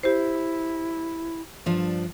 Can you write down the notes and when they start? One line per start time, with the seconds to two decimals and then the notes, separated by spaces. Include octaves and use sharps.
0.03 E4 G4 C5
1.66 G2 F3 D4